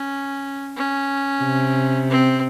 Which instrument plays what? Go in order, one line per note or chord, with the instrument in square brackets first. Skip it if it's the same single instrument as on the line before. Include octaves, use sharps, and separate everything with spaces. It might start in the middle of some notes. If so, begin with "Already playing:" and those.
Already playing: [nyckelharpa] C#4
C#4
[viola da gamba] C3
[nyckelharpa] C4